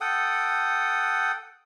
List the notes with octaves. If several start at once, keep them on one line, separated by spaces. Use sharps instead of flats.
A4 F#5 G5 D#6